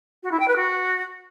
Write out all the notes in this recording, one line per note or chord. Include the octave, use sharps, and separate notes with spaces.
F#4
E4
G5
B4
F#4